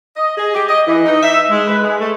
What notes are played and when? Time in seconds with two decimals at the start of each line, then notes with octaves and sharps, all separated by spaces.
0.16 D#5
0.37 G#4
0.54 G4
0.69 D#5
0.86 E3
1.06 D#4
1.22 E5
1.50 G#3
1.67 B4
1.83 G#3
1.99 A3